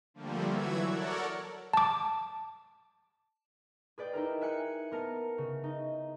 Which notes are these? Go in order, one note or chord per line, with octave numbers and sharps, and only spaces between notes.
D3 F3 G3 A3 A#3
E3 F#3 F#4 E5 G#6
A4 A#4 C#5 D5 F#5
A5 D6
G#4 B4 D5 G5
D#4 E4 A#4
E5 G#5 F#6 G#6 C#7
B3 A#4 A5 C#7
C#3
D#4